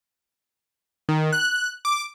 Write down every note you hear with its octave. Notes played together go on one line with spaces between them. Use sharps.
D#3
F#6
D6